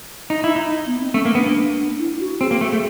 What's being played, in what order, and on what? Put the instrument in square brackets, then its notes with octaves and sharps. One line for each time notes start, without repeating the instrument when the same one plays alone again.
[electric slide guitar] D#4
E4
D#4
[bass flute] B3
C4
[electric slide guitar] A3 [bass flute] C#4
[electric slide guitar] A#3
[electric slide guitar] B3 [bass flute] D4
[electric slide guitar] A#3
[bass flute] E4
F#4
[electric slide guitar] C4 [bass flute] G#4
[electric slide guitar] A#3
A3
A3